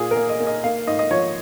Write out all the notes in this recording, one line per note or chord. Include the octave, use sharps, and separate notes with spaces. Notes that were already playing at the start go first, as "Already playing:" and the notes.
Already playing: A#2 G#4
A#4
A#3
D#5
A#3
D#5
A#3 F5
G#2 D#5
D#5
F3 C#5